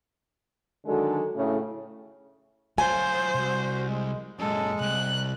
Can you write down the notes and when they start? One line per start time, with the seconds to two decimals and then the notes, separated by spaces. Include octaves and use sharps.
0.86 D3 D#3 F#3 G#3 F#4 A4
1.36 A2 C#3 A3
2.78 F#3 F4 C5 G#5
3.35 C2 F#4
3.88 G#3
4.39 F#2 A#2 G#3 A4
4.81 C2 F#6